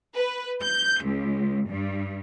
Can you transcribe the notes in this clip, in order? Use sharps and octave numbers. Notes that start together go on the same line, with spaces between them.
B4
G6
C#2
G2